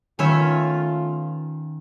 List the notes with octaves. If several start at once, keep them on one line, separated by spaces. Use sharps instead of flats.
D#3 A3 B3 C#4 F4 C#5 E5 B5